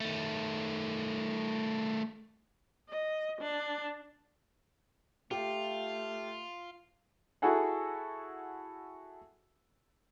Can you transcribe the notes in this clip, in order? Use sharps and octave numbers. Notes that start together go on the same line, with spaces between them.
D#3 A3
D#5
D4
A3 F4 G4
E4 F#4 G#4 A4 F#5 G#5